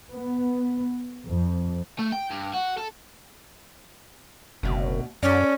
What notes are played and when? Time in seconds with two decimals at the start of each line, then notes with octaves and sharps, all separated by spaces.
0.16 B3
1.26 F2
1.99 A3
2.12 G5
2.30 G2
2.53 F#4
2.77 A4
4.63 F#1 D2 B2
5.23 F#2 C#4 A4 D5